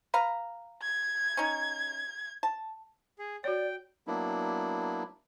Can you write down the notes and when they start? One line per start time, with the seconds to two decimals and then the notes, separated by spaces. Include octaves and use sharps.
0.14 B4 F5 A#5
0.82 G#6
1.37 C#4 D#4
2.43 A5
3.19 G#4
3.44 F#4 C#5 D5 G5
4.07 F#3 A#3 B3 D4 E4